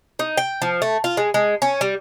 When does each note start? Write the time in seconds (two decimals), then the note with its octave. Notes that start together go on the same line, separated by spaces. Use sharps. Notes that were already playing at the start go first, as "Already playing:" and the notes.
0.19 D#4
0.37 G5
0.62 F3
0.82 A3
1.04 F4
1.17 G#3
1.34 G#3
1.62 C#4
1.81 G3